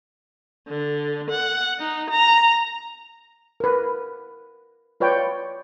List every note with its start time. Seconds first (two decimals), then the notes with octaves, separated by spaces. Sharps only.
0.68 D3
1.30 F#5
1.79 D#4
2.10 A#5
3.60 A#4 B4
5.00 F4 B4 C#5 D5 G5